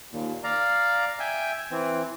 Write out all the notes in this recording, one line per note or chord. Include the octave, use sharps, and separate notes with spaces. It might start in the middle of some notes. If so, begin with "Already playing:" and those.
D#2 A#2
D5 F5 A#5
E5 G5 G#5
E3 C4